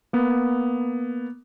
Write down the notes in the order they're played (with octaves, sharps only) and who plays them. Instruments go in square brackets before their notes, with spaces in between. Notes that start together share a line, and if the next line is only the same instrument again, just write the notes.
[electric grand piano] A#3 B3